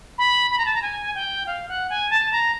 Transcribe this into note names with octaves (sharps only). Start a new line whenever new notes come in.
B5
B5
A#5
A5
A#5
G#5
G5
F5
F#5
G#5
A5
A#5